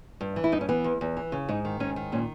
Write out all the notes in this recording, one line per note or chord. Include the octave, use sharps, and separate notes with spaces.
G2
E3
E4
G2 D#4
C#4
E3 B3
E2
E2
E3
C#3
G#2 D#4
D#3
G#2 C#4
D#3
A#2 C#4